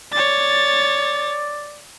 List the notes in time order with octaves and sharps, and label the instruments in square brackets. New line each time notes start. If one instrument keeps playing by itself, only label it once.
[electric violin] C#5 A6 [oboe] D5